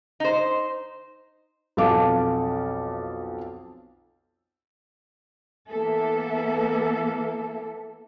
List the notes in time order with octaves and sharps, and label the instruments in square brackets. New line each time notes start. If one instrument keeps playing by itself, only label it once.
[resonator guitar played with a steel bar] D#4 C5
[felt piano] B1 F2 A4 F5 A5 D6
[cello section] E3 A#3 B3 A4 E5